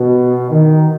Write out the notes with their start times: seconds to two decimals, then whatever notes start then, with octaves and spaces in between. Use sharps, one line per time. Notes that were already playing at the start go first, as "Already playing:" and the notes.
Already playing: B2
0.51 D#3